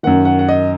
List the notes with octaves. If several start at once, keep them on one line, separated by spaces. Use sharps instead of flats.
F#2 D#3 F#5
F#5
F#5
D#5